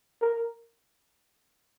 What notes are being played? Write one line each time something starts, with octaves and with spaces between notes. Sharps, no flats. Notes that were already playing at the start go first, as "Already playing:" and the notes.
A#4